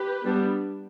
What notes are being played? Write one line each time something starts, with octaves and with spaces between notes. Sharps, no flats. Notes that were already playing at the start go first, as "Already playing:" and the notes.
Already playing: G4 B4
G3 B3 D4